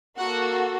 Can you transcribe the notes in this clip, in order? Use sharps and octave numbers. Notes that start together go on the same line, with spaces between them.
A#3 F#4 A4 F#5